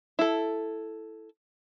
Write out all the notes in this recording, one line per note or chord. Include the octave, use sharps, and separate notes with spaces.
E4 A4